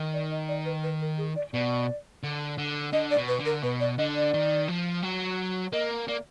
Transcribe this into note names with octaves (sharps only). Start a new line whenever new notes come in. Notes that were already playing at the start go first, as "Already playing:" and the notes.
Already playing: D#3
D5
D#5
D5
B4
B4
A#4
G#4
D5
B2 D5
D3
D3
D3 D#5
D5
B2
B4
D3
A#4
B2 B4
D5
D3 D#5
D5
D#3
F3
F#3
A#3 D#5
A#3 D5